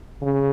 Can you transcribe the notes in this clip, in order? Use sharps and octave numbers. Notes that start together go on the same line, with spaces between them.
C#3